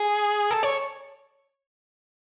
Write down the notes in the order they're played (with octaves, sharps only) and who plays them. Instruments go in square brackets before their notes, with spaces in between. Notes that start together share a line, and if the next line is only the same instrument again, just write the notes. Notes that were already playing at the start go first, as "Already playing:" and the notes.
Already playing: [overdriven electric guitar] G#4
A4
C#5